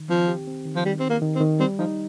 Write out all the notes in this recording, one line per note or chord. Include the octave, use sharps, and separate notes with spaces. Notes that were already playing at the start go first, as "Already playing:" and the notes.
Already playing: D#3
F3 C4
G4
C4
D#3
F3
D#3 G3
C4
D#3
A#3
D#3
C4
D#3
G3 C4
F3 D#4